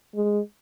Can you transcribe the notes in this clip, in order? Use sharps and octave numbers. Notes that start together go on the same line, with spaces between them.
G#3